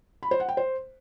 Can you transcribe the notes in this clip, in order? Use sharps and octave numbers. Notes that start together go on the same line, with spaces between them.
B5
C5
F#5
G5
C5